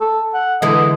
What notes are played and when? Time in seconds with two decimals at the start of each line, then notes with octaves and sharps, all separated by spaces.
0.01 A4
0.34 F#5
0.62 D3 E3 G#3 D#5